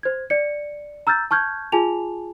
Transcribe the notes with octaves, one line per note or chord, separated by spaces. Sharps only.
C5 G#6
D5 C#7
A#5 E6 F6 G6 A6
A5 C#6 F6 G6 G#6
F4 G#4 G#5 A5 F7